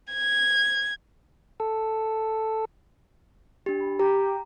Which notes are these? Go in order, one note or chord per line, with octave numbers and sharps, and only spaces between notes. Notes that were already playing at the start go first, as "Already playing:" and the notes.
G#6
A4
D4 G4
B5
G4 A#5